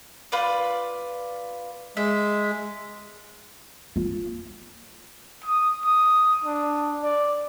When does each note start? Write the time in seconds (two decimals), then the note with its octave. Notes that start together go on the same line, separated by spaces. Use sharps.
0.32 F4 B4 D5
1.97 G#3 E5
3.96 F4
5.45 D#6
5.85 D#6
6.44 D4
7.03 D5